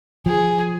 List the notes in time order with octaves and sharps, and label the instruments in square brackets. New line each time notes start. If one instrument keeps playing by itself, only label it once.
[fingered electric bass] F3 [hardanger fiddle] G#4